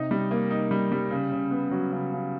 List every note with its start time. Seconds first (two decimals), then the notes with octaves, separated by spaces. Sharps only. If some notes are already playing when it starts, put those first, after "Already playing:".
Already playing: C3 D#4
0.11 G3
0.31 A#3
0.51 D#4
0.71 G3
0.92 G3
1.11 C#3
1.32 C#3
1.51 B3
1.71 F#3
1.91 C#3
2.12 C#3